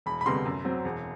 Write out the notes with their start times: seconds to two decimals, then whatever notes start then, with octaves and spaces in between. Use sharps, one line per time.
0.06 E1 B5
0.21 B5
0.25 D2 C3 G3 B3 C6
0.45 F#2
0.65 F#3 C4
0.85 E1